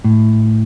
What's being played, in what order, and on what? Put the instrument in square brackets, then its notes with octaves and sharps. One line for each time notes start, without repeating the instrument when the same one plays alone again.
[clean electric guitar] A2